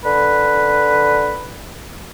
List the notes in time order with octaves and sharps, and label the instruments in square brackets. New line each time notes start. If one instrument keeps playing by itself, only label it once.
[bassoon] D3 [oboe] B4